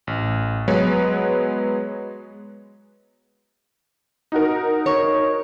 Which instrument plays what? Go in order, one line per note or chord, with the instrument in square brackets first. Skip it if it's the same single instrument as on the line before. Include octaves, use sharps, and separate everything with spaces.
[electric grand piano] A1
F#3 G#3 B3 B4 C#5
[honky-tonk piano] D#4 F#4 A#4
[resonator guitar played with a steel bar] C#5